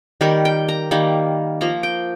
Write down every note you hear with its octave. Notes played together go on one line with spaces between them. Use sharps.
D#3 G3 A#3 A#4
G5
A#5
D#3 G3 A#3 A#5
F3 A#3 A#5
G5